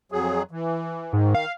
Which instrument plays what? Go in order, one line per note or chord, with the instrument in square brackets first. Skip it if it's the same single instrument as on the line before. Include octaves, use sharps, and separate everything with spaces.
[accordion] F2 F#3 G#4
E3
[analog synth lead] G#2 [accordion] D#3
[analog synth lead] F5